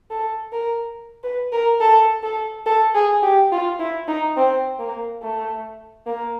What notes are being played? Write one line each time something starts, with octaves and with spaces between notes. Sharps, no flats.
A4
A#4
B4
A#4
A4
A4
A4
G#4
G4
F4
E4
D#4
C4
A#3
A3
A#3